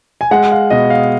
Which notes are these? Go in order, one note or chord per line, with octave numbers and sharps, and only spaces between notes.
G#5
G#3 F#5
F5
B2 D#5
F5